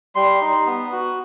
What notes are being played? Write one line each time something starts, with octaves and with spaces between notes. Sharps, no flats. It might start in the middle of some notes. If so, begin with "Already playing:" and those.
G3 C6
D#4
B3
F#4